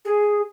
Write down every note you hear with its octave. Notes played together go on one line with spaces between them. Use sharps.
G#4